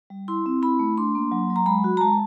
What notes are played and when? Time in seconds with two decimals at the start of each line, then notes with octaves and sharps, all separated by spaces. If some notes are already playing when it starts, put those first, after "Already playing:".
0.10 G3
0.28 E4 C6
0.46 C4
0.62 E4 B5
0.79 A3
0.98 D4 C6
1.15 A#3
1.31 F#3
1.50 F#3
1.56 A#5
1.66 G#3 B5
1.84 F#4
1.97 A#5
2.01 G#3 A5